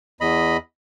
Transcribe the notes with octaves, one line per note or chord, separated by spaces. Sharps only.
E2 D#5 B5